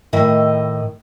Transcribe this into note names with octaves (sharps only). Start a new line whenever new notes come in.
A2 D#3 E4 D#5